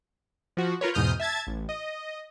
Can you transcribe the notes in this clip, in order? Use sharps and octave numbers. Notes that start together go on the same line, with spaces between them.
F3 F#4
F4 A#4 B4 C#5
E2 G#2 B2 D#6 F6 G6
E5 A5 G#6 A6
A1
D#5